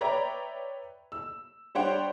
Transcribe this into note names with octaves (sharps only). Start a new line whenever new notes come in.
B4 C#5 D5 E5 G5 A#5
E6
G3 D4 C5 C#5 F#5 G5